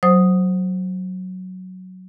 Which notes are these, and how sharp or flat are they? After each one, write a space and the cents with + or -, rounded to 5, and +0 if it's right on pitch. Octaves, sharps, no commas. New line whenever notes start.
F#3 +0 C5 +0 D#6 +0